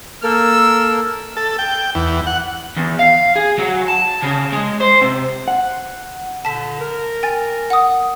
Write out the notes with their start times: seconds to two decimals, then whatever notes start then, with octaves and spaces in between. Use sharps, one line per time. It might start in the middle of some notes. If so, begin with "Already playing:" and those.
0.23 A#3 A4 A#4 E6
1.37 A4
1.59 G5
1.95 E2
2.27 F#5
2.76 E2
2.99 F5
3.36 G#4
3.58 F#3
3.88 A5
4.22 C#3
4.52 G#3
4.80 C5
5.01 C3
5.48 F#5
6.45 A#2 D3 A5 B6
6.79 A#4
7.23 G5 G#5 A6
7.70 F#5 D#6